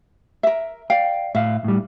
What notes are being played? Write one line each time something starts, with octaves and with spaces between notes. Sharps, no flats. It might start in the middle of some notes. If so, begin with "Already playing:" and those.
A#4 E5
D5 F5 G5
A2 E5 F5
A2 G3